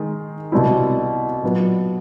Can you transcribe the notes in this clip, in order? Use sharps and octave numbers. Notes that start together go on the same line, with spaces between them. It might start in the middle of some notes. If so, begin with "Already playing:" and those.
Already playing: D#3 G#3
C2 B2 G3 C4 E4
A#2 F#3 B3